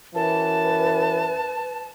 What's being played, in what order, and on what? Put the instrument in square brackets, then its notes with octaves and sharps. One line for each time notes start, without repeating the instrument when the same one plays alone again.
[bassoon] F#2 [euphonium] E3 [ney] B4 [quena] A5